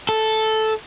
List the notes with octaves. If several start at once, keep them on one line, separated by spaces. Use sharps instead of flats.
A4